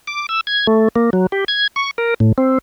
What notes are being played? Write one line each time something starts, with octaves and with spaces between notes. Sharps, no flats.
D6
E6
G#6
A3
A#3
F#3
G4
G#6
C#6
A#4
A2
C4